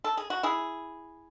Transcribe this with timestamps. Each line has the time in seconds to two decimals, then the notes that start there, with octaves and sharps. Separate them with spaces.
0.04 A4
0.17 G#4
0.30 F#4
0.43 E4 G#4